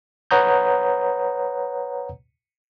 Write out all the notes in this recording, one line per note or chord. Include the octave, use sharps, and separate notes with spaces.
B4 C#5 F#5 A#5 D#6 G6